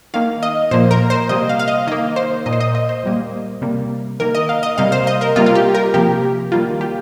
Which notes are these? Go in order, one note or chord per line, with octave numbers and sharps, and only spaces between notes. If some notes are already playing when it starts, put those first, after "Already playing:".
D#3 A#3 F5
D#5
A#2 F3 A#3 C5
A#4
C5
C3 G3 A#3 D#5
F5
F5
D#5
D#3 A#3 D#5
C5
A#2 A#3 D#5
C5
D#5
D#5
C5
A#2 G3 A#3
C3 G3 A#3
D#3 A#3 A#4
D#5
F5
D#5
C3 G3 A#3 F5
C5
D#5
A#4
C3 G3 A#3 F4
F4
G4
A#4
C3 F3 A#3 G4
D#3 G3 A#3 F4
G4